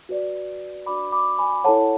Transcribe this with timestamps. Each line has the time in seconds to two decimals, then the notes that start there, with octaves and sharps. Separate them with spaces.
0.09 F#4 B4 D5
0.86 D4 F#4 B4 D5 B5 D6
1.12 B5 D6
1.38 G#5 B5
1.64 E4 A4 C#5 F#5 A5